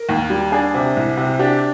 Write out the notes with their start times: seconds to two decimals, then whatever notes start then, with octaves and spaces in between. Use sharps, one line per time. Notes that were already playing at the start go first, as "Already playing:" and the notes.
Already playing: A#4
0.09 D#2
0.30 G3
0.52 D4 G#4
0.74 C3
0.96 C2
1.17 C3
1.39 D4 G4